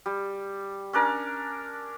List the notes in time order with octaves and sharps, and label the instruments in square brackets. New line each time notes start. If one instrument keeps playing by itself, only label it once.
[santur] G3
C#4 D4 A#4 D5